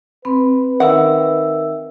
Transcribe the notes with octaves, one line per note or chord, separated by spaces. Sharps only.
C4 B4 B5
D#3 A#4 E5 F#5 E6